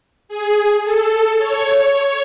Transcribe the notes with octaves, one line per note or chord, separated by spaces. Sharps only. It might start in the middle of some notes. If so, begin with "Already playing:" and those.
G#4
A4
C#5
C#5